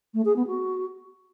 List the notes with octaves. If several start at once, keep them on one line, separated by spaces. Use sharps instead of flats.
A3
G#4
B3
F#4